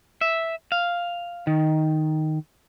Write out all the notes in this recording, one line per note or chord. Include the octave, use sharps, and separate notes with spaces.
E5
F5
D#3